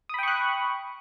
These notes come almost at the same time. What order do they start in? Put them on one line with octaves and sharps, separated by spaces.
D#6 B5 G5 C#6 F#6